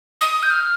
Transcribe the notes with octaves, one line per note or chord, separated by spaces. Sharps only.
D#6
G6
F6